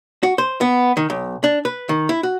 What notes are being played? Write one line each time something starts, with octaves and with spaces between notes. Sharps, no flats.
F#4
C5
B3
D#3
B1
D4
B4
D#3
E4
F#4